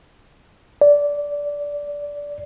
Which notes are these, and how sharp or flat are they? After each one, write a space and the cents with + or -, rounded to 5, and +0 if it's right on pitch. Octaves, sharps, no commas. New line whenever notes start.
D5 -15